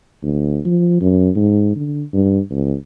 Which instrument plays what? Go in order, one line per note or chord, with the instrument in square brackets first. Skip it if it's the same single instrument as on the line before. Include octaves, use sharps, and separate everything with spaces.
[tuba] D2
F3
F#2
G#2
D3
G2
C#2